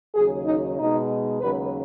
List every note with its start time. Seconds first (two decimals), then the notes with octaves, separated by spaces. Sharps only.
0.15 D#2 C#3 F#3 G#4
0.46 D#4
0.79 B2 G#3 D#4
1.40 D#2 C#3 F#3 B4